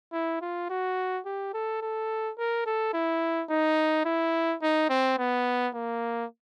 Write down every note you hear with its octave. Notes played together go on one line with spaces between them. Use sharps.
E4
F4
F#4
G4
A4
A4
A#4
A4
E4
D#4
E4
D#4
C4
B3
A#3